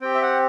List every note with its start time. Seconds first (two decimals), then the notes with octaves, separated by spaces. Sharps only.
0.01 C4 G4 G5
0.15 E5
0.22 F#5